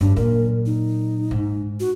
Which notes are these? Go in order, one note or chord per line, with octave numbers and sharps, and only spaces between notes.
G2 F#3 D4
A#2 F#3 A#4
D#4
G#2
F#4